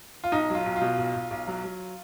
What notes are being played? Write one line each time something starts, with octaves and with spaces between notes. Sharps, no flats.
F4
B1 D#4
F#3
F4
B1
F4
B2
B1
B1
B1
F#3
F#3